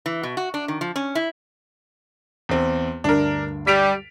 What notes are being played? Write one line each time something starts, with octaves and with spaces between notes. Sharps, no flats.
E3
B2
F#4
D4
D#3
F3
C#4
E4
E2 C4
D2 G2 D4 A#4
G3 B6 D7 F7